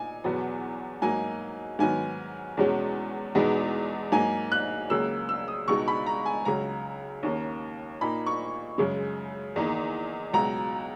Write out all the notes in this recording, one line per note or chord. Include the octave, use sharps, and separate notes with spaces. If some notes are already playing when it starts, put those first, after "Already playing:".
Already playing: A#2 D#4 G#5
E2 B2 F#3 B3
G#2 F#3 A#3 D#4 G#5
G#2 D#3 F#3 B3 G#5
E2 B2 G#3 C#4
E2 B2 G#3 B3 D#4
G#2 F#3 A#3 D#4 G#5
F#6
C#2 C#3 F#3 A#3 E6
E6
D#6
C#2 B2 G#3 D#4 C#6
B5
A#5
G#5
C#2 C#3 F#3 A#5
D#2 D#3 A#3 C#4
A#2 A#3 D#4 B5
C#6
F#2 C#3 G#3
E2 D#3 A#3 D#4
C#2 B2 F#3 A#5